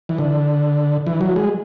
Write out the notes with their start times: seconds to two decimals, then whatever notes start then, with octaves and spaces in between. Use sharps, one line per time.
0.09 E3
0.18 D3
1.07 E3
1.21 F#3
1.36 G#3